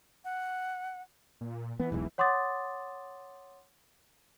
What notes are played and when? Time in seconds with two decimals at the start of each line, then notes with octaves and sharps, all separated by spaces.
0.25 F#5
1.41 A#2
1.80 E3 B3
1.92 E1 B1 E2
2.18 C#5 F#5 C6 D6 D#6 A6